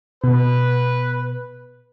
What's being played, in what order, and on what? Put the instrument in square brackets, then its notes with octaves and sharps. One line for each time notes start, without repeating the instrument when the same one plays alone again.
[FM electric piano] B2 [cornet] B4